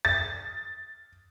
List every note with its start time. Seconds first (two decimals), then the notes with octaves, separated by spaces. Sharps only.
0.05 A6